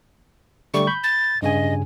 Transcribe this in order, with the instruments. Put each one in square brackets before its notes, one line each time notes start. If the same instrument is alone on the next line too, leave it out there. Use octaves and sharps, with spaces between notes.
[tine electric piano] D3 G3 A3 [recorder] C#6
[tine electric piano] B5 G6
[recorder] A6
[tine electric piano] G2 C#3 G#5 [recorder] D#5